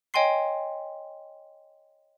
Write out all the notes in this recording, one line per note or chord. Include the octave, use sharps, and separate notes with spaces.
C#5 D#5 G5 G#5 C6 C7